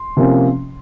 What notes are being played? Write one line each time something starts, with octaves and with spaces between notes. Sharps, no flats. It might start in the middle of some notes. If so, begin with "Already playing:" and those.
Already playing: C6
C3 F3 A#3 C#4